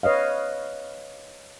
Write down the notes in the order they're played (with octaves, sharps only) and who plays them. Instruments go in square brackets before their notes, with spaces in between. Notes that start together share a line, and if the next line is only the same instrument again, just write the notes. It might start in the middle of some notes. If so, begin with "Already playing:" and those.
[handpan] B4 C#5 D#5 F5